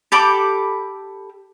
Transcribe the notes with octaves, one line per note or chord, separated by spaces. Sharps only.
G4 A4 B5 D6